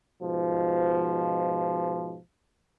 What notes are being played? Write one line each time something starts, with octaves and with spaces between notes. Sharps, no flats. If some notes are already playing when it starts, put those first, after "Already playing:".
G#2 B2 F3